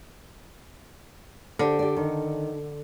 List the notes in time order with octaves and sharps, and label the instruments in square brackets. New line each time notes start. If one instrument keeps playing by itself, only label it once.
[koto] D3 [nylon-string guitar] G4 C5 D5
[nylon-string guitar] G4 D5
D#3